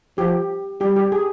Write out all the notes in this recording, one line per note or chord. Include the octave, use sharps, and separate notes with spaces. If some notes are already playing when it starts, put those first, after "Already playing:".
F3 G4
G3 G4
G4
G#4